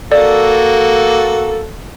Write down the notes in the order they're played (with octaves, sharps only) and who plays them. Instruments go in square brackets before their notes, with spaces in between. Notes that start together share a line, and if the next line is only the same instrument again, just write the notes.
[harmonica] A#3 F#4 [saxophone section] A4 [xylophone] D5